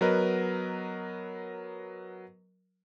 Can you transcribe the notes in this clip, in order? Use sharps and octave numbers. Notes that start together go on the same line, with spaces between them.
F#3 B3 A#4 B4 D#5